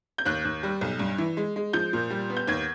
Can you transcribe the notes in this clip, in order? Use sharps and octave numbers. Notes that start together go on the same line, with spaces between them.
G6
D#2 F#6
D#2
G3
B1
G2
E3
G#3
G#3
F3 G6
A#2
G3
B3
G6
D#2 G#6